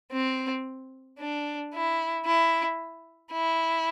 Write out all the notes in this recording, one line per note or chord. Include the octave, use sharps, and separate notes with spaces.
C4
D4
E4
E4
E4